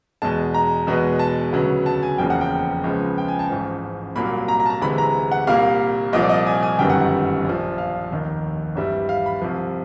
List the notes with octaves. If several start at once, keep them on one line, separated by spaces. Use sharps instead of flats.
E2 B2 G#3 A5
A#5
E2 B2 G#3 B3
A5
D2 C#3 F#3 B3
A5
G#5
F1 E2 C#3 F3 A#3 G5
F#5
G5
C#2 C#3 F3 G#3 B3
G5
G#5
A5
A1 G#2 F3
C2 A#2 F#3 A#3 B5
A#5
A#5
A5
A#5
D2 C3 E3 G#3 B5
A#5
F#5
C2 A#2 G3 A#3 F5
C2 A#2 F3 D#5
D5
D#5
G#5
G#5
G1 F#2 D#3 G3 B3 G5
F#5
F#5
A#1 A#2 F3
F5
F1 D#2 D#3
G#1 G2 E3 G3 E5
F5
B5
C2 C3 F3